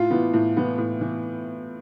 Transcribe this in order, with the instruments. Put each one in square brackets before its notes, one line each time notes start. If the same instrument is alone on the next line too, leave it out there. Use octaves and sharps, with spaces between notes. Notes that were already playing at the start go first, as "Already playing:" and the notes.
Already playing: [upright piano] A2 F4
E3 B3
A2
E3 B3
A2
E3